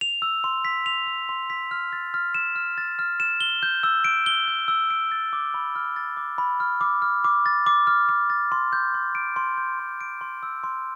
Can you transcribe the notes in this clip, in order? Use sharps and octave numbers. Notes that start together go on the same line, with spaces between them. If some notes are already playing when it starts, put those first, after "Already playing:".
F7
E6
C6
B6
F7
E6
C6
B6
F6
A6
F6
E7
F6
A6
F6
E7
G7
G6
E6
D7
G7
G6
E6
D7
A6
D6
B5
F6
A6
D6
B5
F6
D6
F6
D6
A6
D6
F6
D6
A6
C6
G6
C6
D7
C6
G6
C6
D7
C6
E6
C6